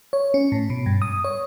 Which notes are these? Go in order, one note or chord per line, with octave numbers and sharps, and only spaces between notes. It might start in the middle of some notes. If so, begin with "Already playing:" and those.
C#5
C#4
A2
B2
G2
D#6
C#5